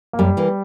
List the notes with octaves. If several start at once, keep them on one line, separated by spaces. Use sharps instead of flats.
A#3
F#2 G3
E3 A#3